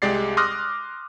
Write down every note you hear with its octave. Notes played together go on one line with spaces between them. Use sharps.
C2 G#3 G4 D5 A6 C7
C6 D6 D#6 F6 F#6 A#6